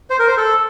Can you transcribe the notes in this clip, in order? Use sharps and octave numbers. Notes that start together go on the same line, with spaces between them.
C5
A#4
C5
A4